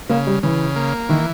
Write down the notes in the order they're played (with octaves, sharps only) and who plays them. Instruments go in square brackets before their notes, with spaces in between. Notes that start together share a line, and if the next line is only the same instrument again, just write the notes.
[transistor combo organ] C#3 [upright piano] A#3
[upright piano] G3
[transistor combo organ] C#3 [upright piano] E3
[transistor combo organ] A#3
[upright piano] D#3 [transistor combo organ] E3